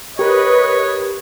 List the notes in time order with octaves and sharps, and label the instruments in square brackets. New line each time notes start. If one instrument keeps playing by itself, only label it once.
[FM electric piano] G4 A#4 [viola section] B4 D#5 [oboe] C#5